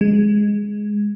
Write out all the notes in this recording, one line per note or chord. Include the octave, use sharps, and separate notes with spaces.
G#3